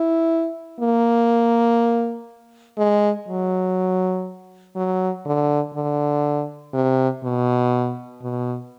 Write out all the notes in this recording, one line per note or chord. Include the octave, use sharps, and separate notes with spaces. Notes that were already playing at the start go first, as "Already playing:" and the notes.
Already playing: E4
A#3
G#3
F#3
F#3
D3
D3
C3
B2
B2